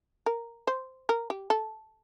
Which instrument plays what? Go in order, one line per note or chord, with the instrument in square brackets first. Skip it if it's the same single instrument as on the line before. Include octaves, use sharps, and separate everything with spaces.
[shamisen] A#4
C5
A#4
G4
A4